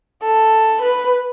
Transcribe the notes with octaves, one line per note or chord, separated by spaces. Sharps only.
A4
B4